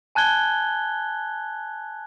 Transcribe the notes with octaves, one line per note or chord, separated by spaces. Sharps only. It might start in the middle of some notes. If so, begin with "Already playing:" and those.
G#5 A5 F#6 G#6 G7